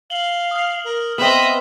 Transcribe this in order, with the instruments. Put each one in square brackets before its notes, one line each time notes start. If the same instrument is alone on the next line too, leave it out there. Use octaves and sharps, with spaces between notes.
[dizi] F5 [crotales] F#7 G7
[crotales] D#6 F6
[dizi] A#4
[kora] B3 C4 [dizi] B4 [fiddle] D#5 E5 [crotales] F#7